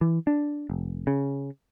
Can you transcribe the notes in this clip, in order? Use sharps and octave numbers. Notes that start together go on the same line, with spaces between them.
E3
D4
F1
C#3